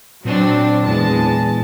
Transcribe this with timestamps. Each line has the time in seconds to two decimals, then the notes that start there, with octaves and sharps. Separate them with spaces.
0.25 A#2 F#3 C4 D4
0.85 E2 G#3 A5